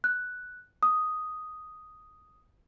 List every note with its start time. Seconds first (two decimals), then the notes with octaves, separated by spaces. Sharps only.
0.04 F#6
0.83 D#6